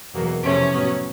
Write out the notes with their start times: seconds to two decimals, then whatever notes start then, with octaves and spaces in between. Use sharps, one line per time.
0.13 E2 B2 F#3 A#3
0.42 F2 C3 E3 A3 C#4
0.72 A2 F#3 B3